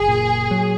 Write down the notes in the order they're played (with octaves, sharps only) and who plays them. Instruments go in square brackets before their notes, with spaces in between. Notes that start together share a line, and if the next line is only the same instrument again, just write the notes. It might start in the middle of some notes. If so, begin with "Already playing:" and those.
Already playing: [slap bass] F#1 [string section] G#4
[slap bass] A#2
F#3